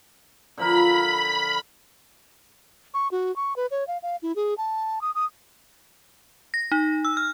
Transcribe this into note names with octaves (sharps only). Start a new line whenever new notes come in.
D3 F3 A#4 B5
C#6
F#4
C#6
B4
C#5
F5
F5
E4
G#4
A5
D#6
D#6
A#6
D#4
E6
F6